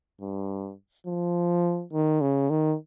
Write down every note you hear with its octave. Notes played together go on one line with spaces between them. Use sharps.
G2
F3
D#3
C#3
D#3